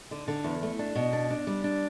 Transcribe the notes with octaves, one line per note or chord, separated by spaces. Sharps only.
D3
D3
E2
A3
D4
B2
D4
D4
G3
D4